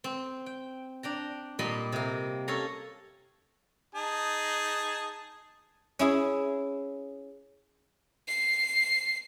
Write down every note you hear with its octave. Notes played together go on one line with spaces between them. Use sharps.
C4
G5
D4 G5 A#5
A#2 G3 A#3 D#5 B5
C3 A#3
C#4 A4 C#5 F5 A#5
D#4 G#4 A5
C#4 E4 G#4
C7